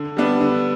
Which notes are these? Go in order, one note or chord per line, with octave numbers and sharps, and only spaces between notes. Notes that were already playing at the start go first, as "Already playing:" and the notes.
Already playing: D3
G3 B3 D4
D3